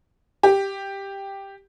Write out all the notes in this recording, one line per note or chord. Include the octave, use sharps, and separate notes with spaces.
G4